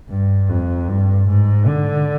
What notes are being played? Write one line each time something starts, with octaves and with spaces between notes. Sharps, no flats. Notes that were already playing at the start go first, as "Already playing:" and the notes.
G2
F2
G2
G#2
D3